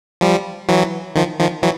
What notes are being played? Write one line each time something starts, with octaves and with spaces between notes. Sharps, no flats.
F3 G3
E3 F#3
D#3 F3
D#3 F3
E3 F#3